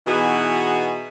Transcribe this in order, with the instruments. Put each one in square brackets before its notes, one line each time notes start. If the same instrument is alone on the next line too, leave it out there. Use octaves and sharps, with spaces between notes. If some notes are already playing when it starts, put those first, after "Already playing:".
[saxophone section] B2 E3 B3 D#4 F#4 G#4